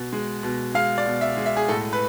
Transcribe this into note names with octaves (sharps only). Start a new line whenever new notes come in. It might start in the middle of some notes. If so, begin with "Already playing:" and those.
Already playing: B2
G#3
B2
G#3 F5
D5
B2
E5
G#3
E5
G#4
A2 A4
B4